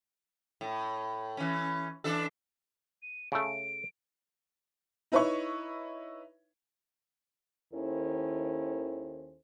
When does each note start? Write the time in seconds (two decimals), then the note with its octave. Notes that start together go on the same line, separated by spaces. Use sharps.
0.61 A2
1.37 E3 C#4
2.04 E3 D4 A4
3.02 D#7
3.32 C#3 A3 D7
5.12 D#4 E4 B4 C#5 E5 C#6
7.74 D#2 D#3 C#4 E4 A4 C5